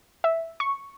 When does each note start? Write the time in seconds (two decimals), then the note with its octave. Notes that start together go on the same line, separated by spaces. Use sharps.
0.24 E5
0.60 C#6